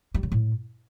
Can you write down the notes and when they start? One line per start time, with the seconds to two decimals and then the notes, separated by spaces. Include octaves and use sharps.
0.14 G3
0.23 C#3
0.32 A2